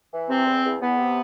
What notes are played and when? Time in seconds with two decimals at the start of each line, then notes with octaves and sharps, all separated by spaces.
0.12 E3
0.29 C3 C4
0.46 E2
0.64 E2
0.81 E2 B3
0.98 C3